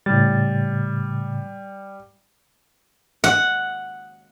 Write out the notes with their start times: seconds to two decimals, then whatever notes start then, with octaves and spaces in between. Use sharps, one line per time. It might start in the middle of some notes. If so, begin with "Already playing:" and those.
0.06 A2 C#3 G3 A6
3.24 F#5